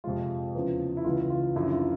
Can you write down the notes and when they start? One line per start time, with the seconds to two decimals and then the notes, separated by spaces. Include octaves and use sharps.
0.04 F2 C3 F3 G#3 F4
0.54 E2 C#3 F3
0.97 E4
1.04 C#2 C#3 E3 F4
1.30 F4
1.56 F#2 D3 F3 E4
1.73 F4